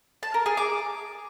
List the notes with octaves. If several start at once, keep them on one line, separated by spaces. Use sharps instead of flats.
A5
A#4
G#4
D6